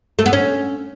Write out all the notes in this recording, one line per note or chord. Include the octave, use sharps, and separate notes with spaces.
A3
B3
C#4